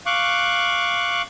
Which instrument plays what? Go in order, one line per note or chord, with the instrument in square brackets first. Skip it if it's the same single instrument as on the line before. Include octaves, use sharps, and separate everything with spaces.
[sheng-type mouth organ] F5 C#6 D6 F#6